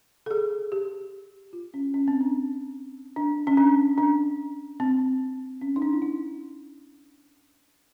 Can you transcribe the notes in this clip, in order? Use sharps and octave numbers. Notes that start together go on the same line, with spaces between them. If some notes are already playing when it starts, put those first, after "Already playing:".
A4
G#4
G4
F4
C#4
C#4
C4
D4
D4
C#4
D4
D4
C4
C#4
D#4
D4
E4
D#4